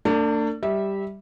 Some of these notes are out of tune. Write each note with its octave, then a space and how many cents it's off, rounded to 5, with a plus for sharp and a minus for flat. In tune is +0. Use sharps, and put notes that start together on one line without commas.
A3 +45 D4 +0
G3 +0 E5 -20